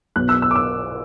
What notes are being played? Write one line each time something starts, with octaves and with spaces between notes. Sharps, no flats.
B1 B2 B3 F#6
E6
E6
D6
E6